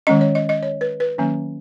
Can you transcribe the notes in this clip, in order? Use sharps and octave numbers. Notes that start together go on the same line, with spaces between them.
D#3 G#3 C#4 D#5
C#5
D#5
D#5
C#5
B4
B4
D#3 F#3 A#3 C#4